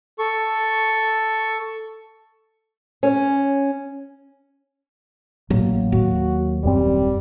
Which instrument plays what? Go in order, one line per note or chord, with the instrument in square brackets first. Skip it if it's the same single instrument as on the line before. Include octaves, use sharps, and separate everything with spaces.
[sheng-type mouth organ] A4 C#6
[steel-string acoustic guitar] C#4
[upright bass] A1 [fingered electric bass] F#3 A#3
[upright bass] D#2 [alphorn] F#4
[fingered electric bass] D#1 F#2 C4 [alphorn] G3